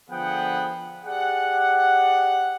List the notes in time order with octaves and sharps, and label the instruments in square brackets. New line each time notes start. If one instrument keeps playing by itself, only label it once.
[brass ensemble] D3 F3 B3 G#4 F#5 G5
G4 G#4 D5 F#5